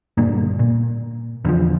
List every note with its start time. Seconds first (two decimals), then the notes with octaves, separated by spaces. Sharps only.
0.17 G2 A#2 D3 A#3
0.59 A#2
1.45 E2 D3 F3